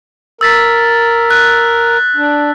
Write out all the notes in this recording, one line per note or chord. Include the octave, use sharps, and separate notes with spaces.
A#4 E6 A6 B6
F#6
D4